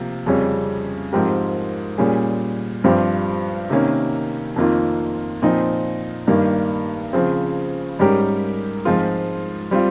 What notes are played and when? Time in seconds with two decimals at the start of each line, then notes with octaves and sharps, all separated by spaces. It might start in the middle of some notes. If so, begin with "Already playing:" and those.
Already playing: C3 F3 A#3
0.26 F2 C#3 G3 C#4
1.13 G#2 F3 C4 G4 A#4
1.98 A#2 G3 C#4 G#4
2.84 G2 F3 C4 G4
3.70 C3 D#3 A#3 C#4
4.56 F2 D#3 A#3 F4
5.42 A#2 F3 C4 D#4
6.27 G2 D#3 G3 A#3
7.13 C#3 F3 C4
7.99 G#2 G3 C#4 G4 A#4
8.85 G#2 F3 G#3 C4 F4
9.71 G3 C4 F4